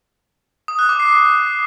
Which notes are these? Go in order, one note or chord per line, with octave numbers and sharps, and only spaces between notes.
D#6
F#6
D6
C7